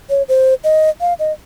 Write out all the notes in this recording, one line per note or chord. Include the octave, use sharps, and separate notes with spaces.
C#5
C5
D#5
F5
D#5